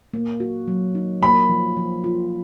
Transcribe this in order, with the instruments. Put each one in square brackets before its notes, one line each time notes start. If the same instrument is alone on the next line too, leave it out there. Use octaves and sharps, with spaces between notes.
[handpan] A#3
F#4
F#3
D#4
[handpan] A#3 [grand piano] B5
[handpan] F3
F3
F4